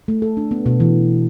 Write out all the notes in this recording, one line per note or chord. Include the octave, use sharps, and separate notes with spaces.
A3
A4
D4
B3
B2
E3